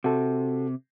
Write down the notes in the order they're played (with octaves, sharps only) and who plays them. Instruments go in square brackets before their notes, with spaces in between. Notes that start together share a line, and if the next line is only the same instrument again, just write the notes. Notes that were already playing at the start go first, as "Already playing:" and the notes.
[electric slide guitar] C3 [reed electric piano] F#4 A4